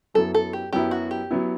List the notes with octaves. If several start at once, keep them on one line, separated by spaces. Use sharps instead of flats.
F#2 F#3 B3 E4 A4
A4
G4
F#2 F#3 B3 E4 G4
F#4
G4
F#3 B3 E4